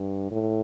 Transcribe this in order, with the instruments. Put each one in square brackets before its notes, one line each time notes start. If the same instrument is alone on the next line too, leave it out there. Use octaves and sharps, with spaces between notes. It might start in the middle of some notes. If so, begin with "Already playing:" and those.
Already playing: [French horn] G2
A2